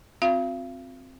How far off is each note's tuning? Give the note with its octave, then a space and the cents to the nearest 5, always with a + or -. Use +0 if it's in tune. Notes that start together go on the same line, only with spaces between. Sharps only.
C4 +0 F4 +45 F5 -40